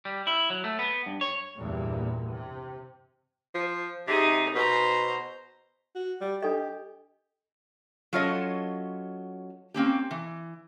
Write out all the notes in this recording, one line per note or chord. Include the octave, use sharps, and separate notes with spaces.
G3
E4
F#3
A3
B3
G2
C#5
E2 G2 A#2
C3
F3
C3 D#4 G#4
B2 C5 A#5
F#4
G3
D4 G4 A4 D#5
F#3 C#4 F4 A4 C#5 D#5
A#3 C4 C#4 G4
E3